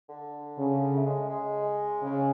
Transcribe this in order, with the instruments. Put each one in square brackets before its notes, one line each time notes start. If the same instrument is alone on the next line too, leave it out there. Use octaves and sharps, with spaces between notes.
[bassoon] D3
[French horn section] C#3
[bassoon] A3
G#3
G#3
[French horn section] C#3